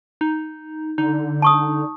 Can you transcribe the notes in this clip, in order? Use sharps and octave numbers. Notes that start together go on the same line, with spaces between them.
D#4
D3 D#4
A5 C#6 D#6